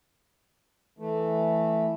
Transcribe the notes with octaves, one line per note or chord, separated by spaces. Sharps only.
E3 A3